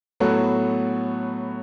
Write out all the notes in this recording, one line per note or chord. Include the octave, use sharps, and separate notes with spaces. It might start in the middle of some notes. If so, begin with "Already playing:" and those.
A2 F#3 B3 F#4 A4